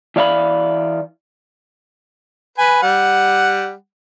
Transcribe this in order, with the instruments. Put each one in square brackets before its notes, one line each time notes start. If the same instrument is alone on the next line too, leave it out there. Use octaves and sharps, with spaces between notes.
[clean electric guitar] E3 D5 F5 G#5 B5
[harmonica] B4 G#5
G3 F#5